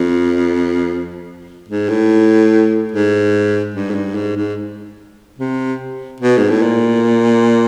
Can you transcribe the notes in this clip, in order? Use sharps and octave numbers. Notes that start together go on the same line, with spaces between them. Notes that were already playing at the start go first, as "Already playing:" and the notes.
Already playing: F2
G#2
A2
G#2
G2
G#2
G2
G#2
G#2
C3
B2
G#2
A2
A#2